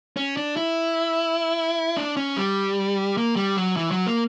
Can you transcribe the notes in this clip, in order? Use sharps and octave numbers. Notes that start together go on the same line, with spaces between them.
C#4
D4
E4
D4
C#4
G3
A#3
G3
F#3
E3
F#3
A#3